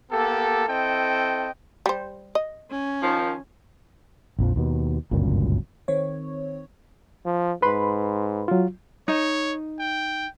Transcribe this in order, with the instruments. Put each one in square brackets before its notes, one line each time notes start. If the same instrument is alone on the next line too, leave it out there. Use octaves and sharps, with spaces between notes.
[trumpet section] A#3 B3 G4 A4
C4 E4 A4 D#5 G5
[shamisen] G3 C5
D#5
[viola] C#4
[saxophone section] D#3 F3
[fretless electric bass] A#1 F2 F3
D#2 B2
G1 C#2 F#2 A#2
[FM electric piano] D#3 C4 C#5
[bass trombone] F3
[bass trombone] G#2 [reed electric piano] B4 B5 C6
[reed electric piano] F#3 F4
[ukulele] D#4 [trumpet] C#5
[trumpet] G5